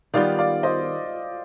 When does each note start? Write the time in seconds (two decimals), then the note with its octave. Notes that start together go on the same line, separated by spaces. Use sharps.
0.14 D#3 G3 B3 F4 D5 F5
0.39 D5 F5
0.63 C5 D#5